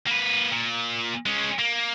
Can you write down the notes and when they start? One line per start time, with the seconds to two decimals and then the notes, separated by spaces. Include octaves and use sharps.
0.07 A#3 B4
0.51 A#2
1.26 G#3 C#4
1.59 A#3